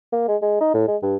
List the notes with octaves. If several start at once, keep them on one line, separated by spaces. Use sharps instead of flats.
A#3
G#3
G#3
D#4
A2
G#3
G2